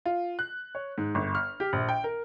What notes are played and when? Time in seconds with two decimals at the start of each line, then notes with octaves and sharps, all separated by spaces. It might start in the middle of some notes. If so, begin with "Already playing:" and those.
0.05 F4
0.39 F#6
0.75 C#5
0.98 G#2
1.15 G1
1.35 F6
1.60 G4
1.73 A#1
1.89 G5
2.04 A#4